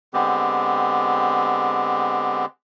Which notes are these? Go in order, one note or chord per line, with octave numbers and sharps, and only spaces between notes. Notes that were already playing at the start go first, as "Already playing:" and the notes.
D3 G#3 B3 C4 G4